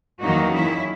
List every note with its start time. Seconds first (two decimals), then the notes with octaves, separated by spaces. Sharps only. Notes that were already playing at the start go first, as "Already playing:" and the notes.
0.21 E2 D#3 F#3 A#3 D#4 F#4
0.53 C#4 E4